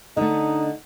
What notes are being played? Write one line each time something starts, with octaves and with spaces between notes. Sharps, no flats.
D3 A3 D#4